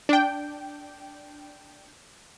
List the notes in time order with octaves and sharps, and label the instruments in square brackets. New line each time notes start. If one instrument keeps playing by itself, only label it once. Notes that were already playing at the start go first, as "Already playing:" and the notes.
[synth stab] D4 G5